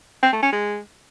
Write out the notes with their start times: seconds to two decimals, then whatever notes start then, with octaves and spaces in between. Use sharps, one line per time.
0.23 C4
0.33 A3
0.43 C#4
0.53 G#3